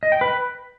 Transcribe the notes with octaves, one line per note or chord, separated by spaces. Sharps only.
D#5
G5
B4